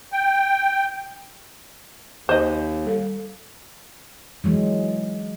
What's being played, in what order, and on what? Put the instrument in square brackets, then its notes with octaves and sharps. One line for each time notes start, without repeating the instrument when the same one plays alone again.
[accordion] G5
[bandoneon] D#2 [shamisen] C5 D#5
[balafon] G3 A4 F5
[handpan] E3 F#3 G#3